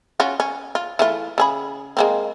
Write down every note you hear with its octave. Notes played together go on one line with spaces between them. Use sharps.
C#4 F4 F#4
C#4
F4
E3 A3 F4
C#3 G#4 B5
G#3 A#3 C4